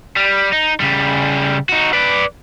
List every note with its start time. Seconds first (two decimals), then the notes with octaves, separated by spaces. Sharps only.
0.16 G3
0.52 D#4
0.80 C#3 G3
1.69 D#4 F#4
1.93 B4 D5